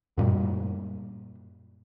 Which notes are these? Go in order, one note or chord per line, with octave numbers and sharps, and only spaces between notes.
F#2 A#2 G3